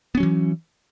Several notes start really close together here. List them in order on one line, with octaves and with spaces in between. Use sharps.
B3 C#4 F#3 E3